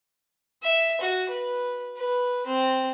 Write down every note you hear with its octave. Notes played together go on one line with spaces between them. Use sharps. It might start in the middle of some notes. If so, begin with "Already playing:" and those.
E5
F#4
B4
B4
C4